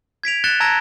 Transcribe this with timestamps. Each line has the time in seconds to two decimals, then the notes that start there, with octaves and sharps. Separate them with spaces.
0.23 G#6 B6 D7 F7
0.44 F#6 A6 C#7 E7 G7
0.60 A5 A#5 E6 G#6 A#6 D7